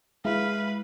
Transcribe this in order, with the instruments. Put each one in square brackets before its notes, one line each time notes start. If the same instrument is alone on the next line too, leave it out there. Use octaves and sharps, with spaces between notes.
[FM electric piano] G#3 [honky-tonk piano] E4 [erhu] B4 [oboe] F5